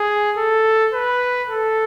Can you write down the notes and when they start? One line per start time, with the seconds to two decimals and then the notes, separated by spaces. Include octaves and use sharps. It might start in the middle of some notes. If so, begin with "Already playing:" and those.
Already playing: G#4
0.37 A4
0.93 B4
1.50 A4